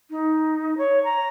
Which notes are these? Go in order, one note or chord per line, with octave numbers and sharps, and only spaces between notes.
D#4
C#5
A#5